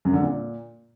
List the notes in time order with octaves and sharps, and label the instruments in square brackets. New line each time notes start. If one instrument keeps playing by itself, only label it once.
[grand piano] F#2
D3
A#2